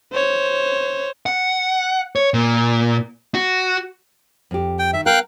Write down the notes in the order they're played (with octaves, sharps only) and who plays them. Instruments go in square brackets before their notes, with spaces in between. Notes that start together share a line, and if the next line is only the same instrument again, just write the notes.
[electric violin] C5 C#5
[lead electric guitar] F#5
C#5
A#2
F#4
[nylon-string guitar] F2 G4
[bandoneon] G5
[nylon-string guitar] D#3 [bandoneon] E5
[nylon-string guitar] B3 A#4 [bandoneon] F5 G5 F#6